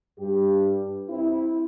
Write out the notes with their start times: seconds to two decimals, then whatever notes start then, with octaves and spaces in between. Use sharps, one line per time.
0.19 G2 G4
1.10 C4 E4